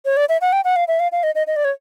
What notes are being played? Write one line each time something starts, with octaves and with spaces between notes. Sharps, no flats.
C#5
D5
E5
F#5
G5
F#5
F5
E5
F5
F5
D#5
D#5
D#5
D5
C#5